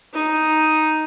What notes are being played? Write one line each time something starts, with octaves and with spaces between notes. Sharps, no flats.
D#4